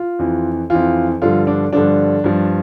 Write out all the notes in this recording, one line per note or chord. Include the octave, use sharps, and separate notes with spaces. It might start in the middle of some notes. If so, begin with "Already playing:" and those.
Already playing: F4
F2 E3
F2 E3 F4
G2 D3 F3 F4
D4
G2 D3 F3 D4
G2 F3